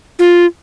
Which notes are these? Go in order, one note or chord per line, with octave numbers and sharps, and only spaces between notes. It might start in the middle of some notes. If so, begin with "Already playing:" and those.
F4